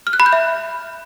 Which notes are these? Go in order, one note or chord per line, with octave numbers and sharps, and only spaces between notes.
F6
F#6
B5
G6
E5